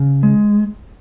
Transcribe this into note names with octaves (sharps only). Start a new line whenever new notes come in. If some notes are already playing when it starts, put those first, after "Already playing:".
Already playing: C#3
G#3